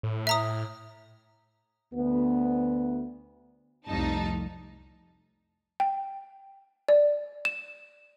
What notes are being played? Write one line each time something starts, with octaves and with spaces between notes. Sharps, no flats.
A2
E5 A#5 D#6
D2 B3
C2 F2 A2 G3 D#4 A5
G5
D5
E7